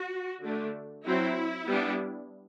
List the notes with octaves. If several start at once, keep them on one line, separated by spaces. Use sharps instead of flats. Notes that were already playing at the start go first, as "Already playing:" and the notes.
Already playing: F#4
D3 A3 D4
F#3 C4 E4
G3 B3 D4